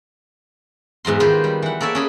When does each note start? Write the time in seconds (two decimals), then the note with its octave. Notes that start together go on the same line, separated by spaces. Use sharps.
1.05 E2 G#2 F#3 C6
1.20 D#3 F4 G4 B4 C5 C6
1.44 G3
1.62 E3 F#5
1.81 A#3 A4 C#5 D5 E5
1.95 C#4 G#4 B5